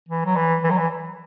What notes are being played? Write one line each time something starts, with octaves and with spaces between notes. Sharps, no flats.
E3
F#3
E3
E3
F#3
E3